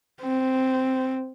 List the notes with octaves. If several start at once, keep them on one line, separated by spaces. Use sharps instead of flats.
C4